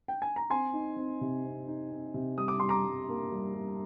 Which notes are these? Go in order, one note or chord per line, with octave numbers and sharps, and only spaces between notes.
G5
G#5
A#5
C4 G#5 C6
D#4
C4
C3
C4
D#4
C4
C3
G3 D#6
D6
G3 C6
A#5 D6
G3
A#3
G3
G3